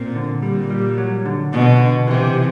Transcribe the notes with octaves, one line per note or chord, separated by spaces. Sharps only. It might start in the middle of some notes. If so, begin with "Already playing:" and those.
Already playing: A#2 C4
D3
A#2 G3
G3
F#3
D3
B2 D3
D3
C3 E3
E3